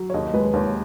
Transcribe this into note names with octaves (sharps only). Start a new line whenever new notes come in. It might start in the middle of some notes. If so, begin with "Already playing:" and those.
Already playing: F#3
C#5
D#2 D#5
G#3 B4
D#2 C#5